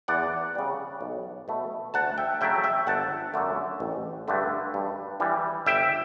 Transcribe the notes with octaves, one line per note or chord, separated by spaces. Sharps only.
E2 D5 F#5
C#3 G3
B1
B2 A3
D2 F#5 A5
E5 G5
C#3 F#3 A3 E5 G5
E5 G5
G1 F#5 A5
F#2 D3 A3
A1
G2 D3 A3
G2
E3 G3
G1 E5 G5